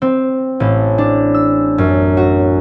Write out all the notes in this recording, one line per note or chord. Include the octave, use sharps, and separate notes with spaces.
C4
A1
D4
E6
F#2
F#4